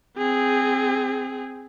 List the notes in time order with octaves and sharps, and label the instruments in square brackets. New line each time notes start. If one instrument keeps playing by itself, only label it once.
[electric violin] C4 G#4